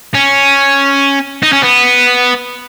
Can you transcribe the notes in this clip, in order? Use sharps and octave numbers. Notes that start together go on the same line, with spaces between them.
C#4
D#4
C#4
B3